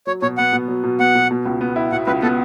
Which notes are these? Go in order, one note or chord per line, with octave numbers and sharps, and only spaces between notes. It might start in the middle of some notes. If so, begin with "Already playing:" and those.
F#3 C#5
B2 C#5
B3 F#5
B2
F#3
B2
B3 F#5
B2
B2
C#2
B3
E4
B2 F#5
C#2 B4
B3 A4